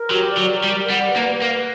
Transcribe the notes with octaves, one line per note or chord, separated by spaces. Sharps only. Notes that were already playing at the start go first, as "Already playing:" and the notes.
Already playing: A#4
F#3 G4
D5
F#3
A#4
G3
D5
G3 F#5
B4
A#3
B4
A#3
B4